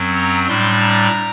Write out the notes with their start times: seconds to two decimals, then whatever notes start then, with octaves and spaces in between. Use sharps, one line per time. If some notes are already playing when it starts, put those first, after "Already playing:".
Already playing: F#2 F#3 C4
0.17 A#5
0.48 A2 G3 D4 C6
0.80 A#5